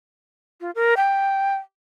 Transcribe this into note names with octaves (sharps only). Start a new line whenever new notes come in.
F4
A#4
G5